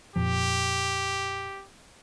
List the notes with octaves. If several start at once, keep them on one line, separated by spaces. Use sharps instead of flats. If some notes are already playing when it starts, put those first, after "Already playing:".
F2 A#2 F3 G4